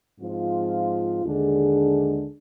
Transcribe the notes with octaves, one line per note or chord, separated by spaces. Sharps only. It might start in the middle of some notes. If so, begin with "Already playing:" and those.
G#2 F3 C4 F4
D#2 D3 G#3 D4 G#4